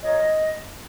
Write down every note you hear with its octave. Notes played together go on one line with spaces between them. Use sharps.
F4 A#4 C#5 D#5